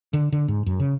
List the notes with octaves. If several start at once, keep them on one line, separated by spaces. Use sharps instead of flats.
D3
D3
G#2
F#2
C#3